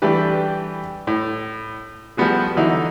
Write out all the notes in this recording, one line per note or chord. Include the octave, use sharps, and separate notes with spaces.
E3 G3 A3 D4 G4 B4
A2
F3 G3 A3 B3 F#4 G#4
D3 E3 F#3 D#4 E4